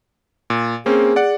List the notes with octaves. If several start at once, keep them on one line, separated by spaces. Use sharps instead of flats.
A#2
A#3 C4 C#4 G#4
D5 F#5